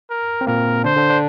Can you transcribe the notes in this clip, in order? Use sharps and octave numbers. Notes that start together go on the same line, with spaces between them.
A#4
C4
A#2 A#3 A#4
D3 D4 C5
D3 D4
D3 D4